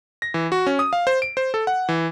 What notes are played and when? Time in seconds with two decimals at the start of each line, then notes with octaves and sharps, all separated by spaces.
0.22 A#6
0.34 E3
0.52 F#4
0.67 C#4
0.79 D#6
0.93 F5
1.07 C5
1.22 D7
1.37 C5
1.54 A4
1.67 F#5
1.89 E3